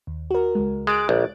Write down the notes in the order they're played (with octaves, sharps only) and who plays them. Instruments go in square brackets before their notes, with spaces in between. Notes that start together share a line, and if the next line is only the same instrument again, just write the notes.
[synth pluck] D#2
F#4 A#4
C#2 G#3
[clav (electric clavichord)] G#3 [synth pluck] F#6 A6 D7
[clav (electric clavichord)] A#1